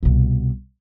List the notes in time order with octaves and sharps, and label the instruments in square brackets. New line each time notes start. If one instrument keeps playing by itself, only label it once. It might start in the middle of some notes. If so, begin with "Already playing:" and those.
[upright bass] C2 B2